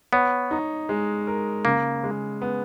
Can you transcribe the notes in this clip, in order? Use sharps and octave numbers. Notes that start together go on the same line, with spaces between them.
B3 C#5
D#4
G#3
A#4
C#3 A#3
G#3
B3